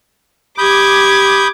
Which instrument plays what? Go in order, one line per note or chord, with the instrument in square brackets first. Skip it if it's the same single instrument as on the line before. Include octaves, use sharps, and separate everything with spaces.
[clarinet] G4 [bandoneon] B5 D#6 G6 [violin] D6 G#6